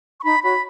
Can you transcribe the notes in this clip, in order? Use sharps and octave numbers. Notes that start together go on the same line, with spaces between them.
C#6
D#4 B5
F#4 C#5 B5